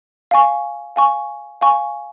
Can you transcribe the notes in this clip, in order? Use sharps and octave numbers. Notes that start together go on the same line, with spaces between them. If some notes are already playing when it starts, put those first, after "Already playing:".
F5 G#5 C#6
F5 G#5 C#6
F5 G#5 C#6